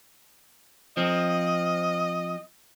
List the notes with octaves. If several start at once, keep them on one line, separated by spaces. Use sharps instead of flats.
F3 C4 D#5